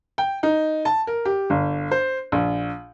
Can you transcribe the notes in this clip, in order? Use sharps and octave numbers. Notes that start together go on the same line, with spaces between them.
G5
D#4
A5
A#4
G4
G1
C5
A#1